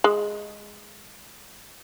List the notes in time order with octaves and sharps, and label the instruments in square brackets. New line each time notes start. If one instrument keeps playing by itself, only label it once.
[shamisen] G#3